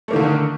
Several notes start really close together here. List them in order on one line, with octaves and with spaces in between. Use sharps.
A3 A#3 D#3 D3